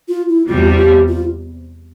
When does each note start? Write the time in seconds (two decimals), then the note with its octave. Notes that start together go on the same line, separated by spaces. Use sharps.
0.08 F4
0.29 E4
0.48 E2 C3 G3 F4
0.58 G4
0.66 F4
0.77 G4
1.08 F4